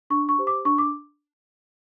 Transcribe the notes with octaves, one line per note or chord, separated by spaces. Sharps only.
D4 C#6
C#6
G4 C5
D6
D4 C#6
D6